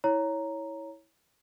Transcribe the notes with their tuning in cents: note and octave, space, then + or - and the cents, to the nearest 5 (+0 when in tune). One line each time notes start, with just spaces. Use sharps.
E4 -20 C#5 +0 A#5 +0